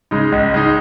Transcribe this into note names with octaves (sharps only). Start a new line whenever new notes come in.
C#3 G#3 D#4
C#2
C#3 G#3 D#4